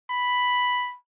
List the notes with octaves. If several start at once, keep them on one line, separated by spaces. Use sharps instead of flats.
B5